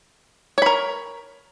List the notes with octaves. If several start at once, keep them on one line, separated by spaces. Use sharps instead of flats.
A#4 C#5 B5